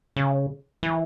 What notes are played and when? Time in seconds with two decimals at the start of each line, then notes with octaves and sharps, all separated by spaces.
0.16 C#3
0.83 E3